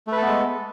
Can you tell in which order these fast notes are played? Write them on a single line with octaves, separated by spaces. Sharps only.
A3 B4 A4 B3 G#3